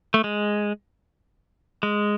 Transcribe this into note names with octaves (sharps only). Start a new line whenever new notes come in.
A3
G#3
G#3